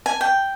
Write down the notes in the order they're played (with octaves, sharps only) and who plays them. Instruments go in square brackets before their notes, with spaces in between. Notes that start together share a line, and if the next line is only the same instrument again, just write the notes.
[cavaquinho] G#5
G5